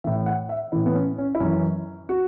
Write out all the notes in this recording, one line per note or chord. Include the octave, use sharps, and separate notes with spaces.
A2 E3 E5
F#5
E5
A2 E3 E4
B3
C#4
C#4
E4
F#2 E3 C#4
F#4